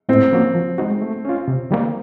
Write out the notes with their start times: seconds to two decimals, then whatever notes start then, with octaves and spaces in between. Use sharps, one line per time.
0.09 A2 C4
0.32 F3 A#3 C#4 F#4
0.55 F3
0.78 G#3 C4 D#4 F#4
1.02 A3
1.25 C#4 F4
1.48 C3
1.71 D#3 G3 A#3